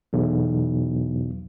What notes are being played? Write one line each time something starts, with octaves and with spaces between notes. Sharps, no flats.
B1 E2